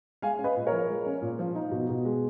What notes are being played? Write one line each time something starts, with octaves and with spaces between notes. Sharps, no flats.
G#3 F5 G#5
C#4
B4 D#5
A#2
A#4 C#5
F3
G#3
C#4
A#2
F3
D#4
B2
B2
G#3